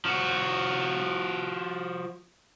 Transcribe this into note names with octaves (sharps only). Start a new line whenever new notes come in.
F3 F#4